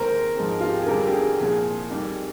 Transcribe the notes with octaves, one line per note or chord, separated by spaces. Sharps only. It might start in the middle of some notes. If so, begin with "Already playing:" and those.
Already playing: D#2 D#3 G#3 C4 A#4 C5
G#2 F3 G#3 C4
F4
G4
G#4
F2 D3 G3 A#4
G4
G#4
C2 A#2 F3 G#4
F2 D#3 G3